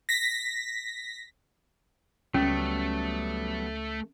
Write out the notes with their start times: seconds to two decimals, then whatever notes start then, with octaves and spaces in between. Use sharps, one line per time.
0.09 A#6 B6
2.34 C#2 F#3 G3 A3 B3 C#4